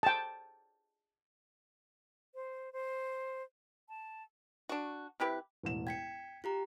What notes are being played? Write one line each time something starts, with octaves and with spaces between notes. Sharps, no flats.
G5 A5
C5
C5
A5
D4 F#4
C3 E4 G4 B4
E1 A1 E7
G5 G#6 B6 C#7
F4 G4 A#5